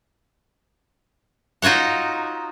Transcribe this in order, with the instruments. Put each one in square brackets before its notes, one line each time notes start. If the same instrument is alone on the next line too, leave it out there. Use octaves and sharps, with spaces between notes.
[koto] D#4 F4 F#4 C#5 F#5